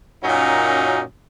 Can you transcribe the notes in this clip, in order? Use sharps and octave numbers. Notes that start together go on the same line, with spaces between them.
F#2 A#2 F#3 C#4 D#4